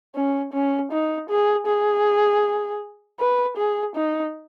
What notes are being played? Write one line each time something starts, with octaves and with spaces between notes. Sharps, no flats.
C#4
C#4
D#4
G#4
G#4
B4
G#4
D#4